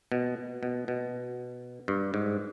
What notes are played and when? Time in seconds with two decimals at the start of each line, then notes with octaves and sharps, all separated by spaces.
0.12 B2
0.63 B2
0.88 B2
1.88 G2
2.14 G#2